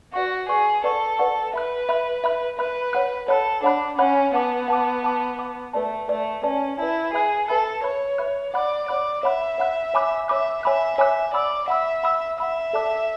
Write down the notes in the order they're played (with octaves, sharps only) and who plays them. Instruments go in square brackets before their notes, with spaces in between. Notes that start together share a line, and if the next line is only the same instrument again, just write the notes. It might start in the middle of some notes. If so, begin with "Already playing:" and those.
[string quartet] F#4 [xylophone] B4 D5 F#5 C#6
[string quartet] G#4 [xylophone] B4 D5 F#5 C#6
[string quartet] A4 [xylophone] B4 D5 F#5 C#6
[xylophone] B4 D5 F#5 C#6
[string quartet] B4 [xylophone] E5 B5 F#6
[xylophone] E5 B5 F#6
E5 B5 F#6
[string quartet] B4 [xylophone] E5 B5 F#6
[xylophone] C#5 F#5 B5 F#6
[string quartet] A4 [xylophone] C#5 F#5 B5 F#6
[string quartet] D4 [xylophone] C#5 F#5 B5 F#6
[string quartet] C#4 [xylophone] C#5 F#5 B5 F#6
[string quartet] B3 [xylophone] F#5 A5 D6
[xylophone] F#5 A5 D6
F#5 A5 D6
F#5 A5 D6
[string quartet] A3 [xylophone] B4 D5 A5
[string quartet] A3 [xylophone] B4 D5 A5
[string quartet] C#4 [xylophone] B4 D5 A5
[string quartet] E4 [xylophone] B4 D5 A5
[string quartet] G#4 [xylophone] B4 E5 B5 F#6
[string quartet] A4 [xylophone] B4 E5 B5 F#6
[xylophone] B4 E5 B5 F#6 [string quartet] C#5
[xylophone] B4 E5 B5 F#6
[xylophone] C#5 F#5 B5 F#6 [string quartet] D5
[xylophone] C#5 F#5 B5 F#6 [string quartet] D5
[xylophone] C#5 F#5 B5 F#6 [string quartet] E5
[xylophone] C#5 F#5 B5 F#6
C#5 G#5 B5 D6 F#6
[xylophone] C#5 G#5 B5 D6 F#6 [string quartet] E5
[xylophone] C#5 G#5 B5 D6 F#6 [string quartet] E5
[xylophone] C#5 G#5 B5 D6 F#6 [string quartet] E5
[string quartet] D5 [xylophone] F#5 B5 E6
[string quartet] E5 [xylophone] F#5 B5 E6
[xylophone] F#5 B5 E6
[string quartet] E5 [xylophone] F#5 B5 E6
[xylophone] A4 D5 A5 D6 F#6